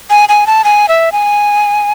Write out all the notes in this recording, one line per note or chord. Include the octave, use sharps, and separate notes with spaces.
G#5
G#5
A5
G#5
E5
G#5